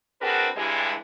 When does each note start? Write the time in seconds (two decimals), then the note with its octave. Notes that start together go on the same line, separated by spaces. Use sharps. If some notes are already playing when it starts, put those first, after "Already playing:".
0.22 C4 D4 F#4 G#4 A#4 B4
0.56 G2 D3 E3 G3 G#3